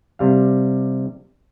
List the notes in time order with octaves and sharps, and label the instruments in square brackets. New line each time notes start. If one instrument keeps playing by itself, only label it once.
[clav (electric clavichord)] C3 G3 F5